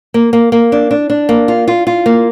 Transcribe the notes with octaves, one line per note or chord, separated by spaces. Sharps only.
A#3
A#3
A#3
D4
D4
D4
A#3
F4
F4
F4
A#3